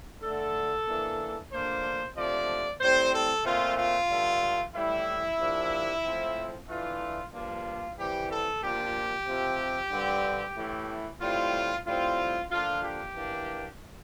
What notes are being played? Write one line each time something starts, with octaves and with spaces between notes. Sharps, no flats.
D3 A3 D4 A4
E3 A#3 D4
D3 F3 A#3 D4 C5
C3 F3 A3 D4 D5
A2 G3 C4 C5
A4
A#2 A3 C4 F4
F4
G2 D3 A3
A2 E3 G3 E4
C3 F3 A#3 D4
A2 F3 C4
E3 A3 D4 F4
G2 F3 A#3 D4 F4
E3 G3 C4 G4
A4
A#2 F3 A#3 D4 G4
C3 F3 C4
G2 D3 G3 C4
A2 E3 A3
A2 G3 C4 F4
A2 G3 C4 F4
D3 F3 A#3 D4 F4
G4
E3 A#3 D4